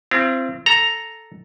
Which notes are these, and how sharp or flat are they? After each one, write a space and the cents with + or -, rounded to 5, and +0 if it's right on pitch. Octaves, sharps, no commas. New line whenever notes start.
C4 +0 F4 -45
A4 +0 A#5 +0